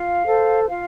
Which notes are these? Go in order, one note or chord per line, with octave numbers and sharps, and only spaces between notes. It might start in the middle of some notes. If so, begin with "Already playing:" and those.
Already playing: F4 F5
A4 C5
F4 F5